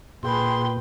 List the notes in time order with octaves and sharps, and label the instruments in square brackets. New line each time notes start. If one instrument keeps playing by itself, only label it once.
[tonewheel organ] A#2 [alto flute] G#4 [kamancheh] B4 G5 [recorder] C6